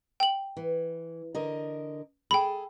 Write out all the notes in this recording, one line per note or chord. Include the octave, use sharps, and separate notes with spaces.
G5 F#7
E3
D3 A#4 D#5
G#4 A4 G5 B5